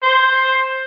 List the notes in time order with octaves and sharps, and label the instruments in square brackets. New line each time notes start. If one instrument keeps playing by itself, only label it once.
[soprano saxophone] C5